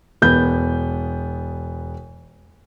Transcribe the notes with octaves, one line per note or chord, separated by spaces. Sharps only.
E1 B3 G6